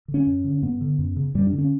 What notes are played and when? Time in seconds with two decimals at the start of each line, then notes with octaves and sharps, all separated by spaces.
0.08 D3
0.14 C#4
0.27 F#2
0.44 D3
0.62 G2 B3
0.81 D3
0.99 F#2
1.16 C#3
1.35 F#2 G3
1.47 D4
1.53 D3
1.58 C#4